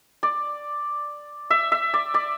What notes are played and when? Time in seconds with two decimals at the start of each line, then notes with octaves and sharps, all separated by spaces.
0.23 D5
1.50 E5
1.72 E5
1.94 D5
2.14 D5